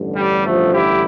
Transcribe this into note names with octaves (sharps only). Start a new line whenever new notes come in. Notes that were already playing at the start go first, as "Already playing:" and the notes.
Already playing: A1 G2 D3
G3
F3 A3
E4 G4